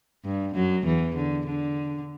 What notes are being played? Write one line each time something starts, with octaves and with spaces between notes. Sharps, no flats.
G2
F#2 F#3
E2 E3
D3
D3